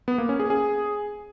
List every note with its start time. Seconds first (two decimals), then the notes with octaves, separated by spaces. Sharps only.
0.08 B3
0.18 A#3
0.29 C#4
0.40 G#4
0.50 G#4